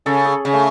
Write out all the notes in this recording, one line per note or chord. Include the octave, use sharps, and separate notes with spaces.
C#3 A4
G#4
C#3
A3